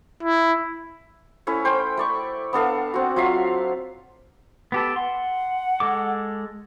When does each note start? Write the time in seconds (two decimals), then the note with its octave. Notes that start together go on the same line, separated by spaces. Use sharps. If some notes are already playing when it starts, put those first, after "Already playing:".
0.23 E4
1.47 A3 C#4 E4
1.65 C5 G5
1.97 A3 D5 C#6
2.53 B3 D4 A4 F5
2.94 C4 F#4
3.16 F#3 F4 E5 F5
4.72 B3 G4 A4
4.96 F#5 C6
5.80 G#3 A4 D6